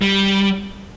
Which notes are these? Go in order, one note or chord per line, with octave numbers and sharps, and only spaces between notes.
G3